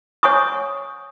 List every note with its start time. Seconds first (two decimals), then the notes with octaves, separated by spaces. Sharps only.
0.23 C#5 F#5 G#5 C#6 D#6